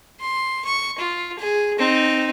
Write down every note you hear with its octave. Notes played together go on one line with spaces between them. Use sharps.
C6
C#6
F4
G#4
C4 D#4